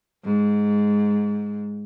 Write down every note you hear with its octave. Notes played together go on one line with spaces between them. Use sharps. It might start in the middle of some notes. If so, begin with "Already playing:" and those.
G#2